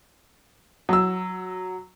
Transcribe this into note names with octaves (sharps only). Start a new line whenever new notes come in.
F#3 E6